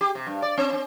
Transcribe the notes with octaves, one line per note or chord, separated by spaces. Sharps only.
G4
C3
G2
D5
C4
C4